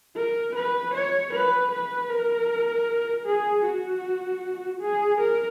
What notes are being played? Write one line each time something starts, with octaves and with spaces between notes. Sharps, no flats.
A#4
B4
C#5
B4
B4
A#4
G#4
F#4
G#4
A#4